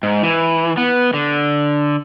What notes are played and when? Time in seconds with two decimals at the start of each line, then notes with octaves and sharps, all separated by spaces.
0.03 G#2
0.23 E3
0.77 B3
1.14 D3